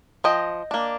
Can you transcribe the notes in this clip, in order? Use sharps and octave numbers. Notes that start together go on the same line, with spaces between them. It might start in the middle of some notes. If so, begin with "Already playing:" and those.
F3 D#5 G5
A#3 D4